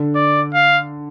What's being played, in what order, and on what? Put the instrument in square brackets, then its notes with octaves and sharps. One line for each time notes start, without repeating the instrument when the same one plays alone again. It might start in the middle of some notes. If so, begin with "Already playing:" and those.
Already playing: [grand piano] D3
[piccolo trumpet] D5
F5